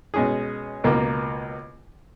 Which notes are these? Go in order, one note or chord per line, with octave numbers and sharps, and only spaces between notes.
B2 G#3 C#4 G#4
C#2 B2 A#3